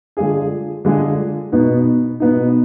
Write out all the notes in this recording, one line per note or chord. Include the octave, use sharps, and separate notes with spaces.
D3 G#3 D4 F4 G#4
D3 G#3 D4 F4 G#4
B2 B3 D#4
B2 B3 D#4